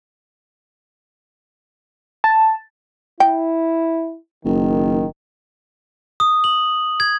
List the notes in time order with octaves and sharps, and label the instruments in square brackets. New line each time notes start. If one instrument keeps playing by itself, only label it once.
[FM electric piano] A5
[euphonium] E4 [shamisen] G5
[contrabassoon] F#1 [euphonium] D#3
[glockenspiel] D#6
F#7
G#6